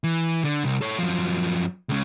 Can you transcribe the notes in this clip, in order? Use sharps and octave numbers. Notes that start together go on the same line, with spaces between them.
E3
D3
C2
A4 C#5
F#2 F3
C#2 C#3